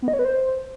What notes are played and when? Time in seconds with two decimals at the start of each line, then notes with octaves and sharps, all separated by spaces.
0.02 B3
0.08 D#5
0.13 C#5
0.19 B4
0.25 C5